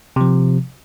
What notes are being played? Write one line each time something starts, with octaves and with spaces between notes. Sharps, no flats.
C3 F3